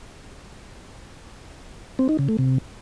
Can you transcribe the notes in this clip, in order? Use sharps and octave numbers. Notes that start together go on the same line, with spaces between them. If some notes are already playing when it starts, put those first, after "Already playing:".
C4
D#4
C#3
A3
C3